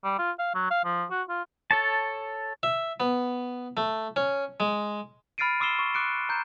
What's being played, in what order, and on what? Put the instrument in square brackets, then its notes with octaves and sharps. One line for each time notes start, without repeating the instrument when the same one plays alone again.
[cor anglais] G3
F4
F5
F#3
F5
F3
F#4
F4
[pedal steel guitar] A4 C#5 A5
[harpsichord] E5
B3
A3
C#4
G#3
[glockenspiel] B5 F6 A6 C7 D7 D#7
C6 D6 E6 C7 E7 G7
C#6
D6 F#6 C#7 D7
A#5 G6